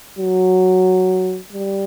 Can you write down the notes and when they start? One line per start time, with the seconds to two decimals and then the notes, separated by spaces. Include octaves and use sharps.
0.19 F#3
1.52 G3